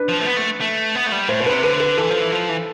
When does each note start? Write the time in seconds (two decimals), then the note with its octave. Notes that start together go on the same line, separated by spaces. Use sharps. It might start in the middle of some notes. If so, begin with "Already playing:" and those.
Already playing: D4 B4
0.09 F3
0.20 A3
0.26 B3
0.37 A3
0.61 A3
0.95 B3
1.07 A3
1.12 G3
1.28 A2 C5
1.40 B2 C5
1.46 D3 B4
1.52 C3
1.63 D3 B4
1.80 B4
1.98 E3 A4
2.09 F3
2.21 E3
2.32 F3
2.49 E3